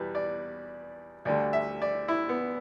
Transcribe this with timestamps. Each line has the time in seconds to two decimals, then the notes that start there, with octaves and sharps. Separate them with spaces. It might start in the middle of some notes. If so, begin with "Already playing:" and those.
Already playing: E2 B2 G3 B4
0.15 D5
1.25 D2 D3 G3 D5
1.53 E5
1.82 D5
2.08 E4
2.29 B3